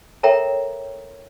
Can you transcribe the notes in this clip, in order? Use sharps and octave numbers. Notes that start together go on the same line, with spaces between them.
A4 A#4 C#5 E5 G5 A#5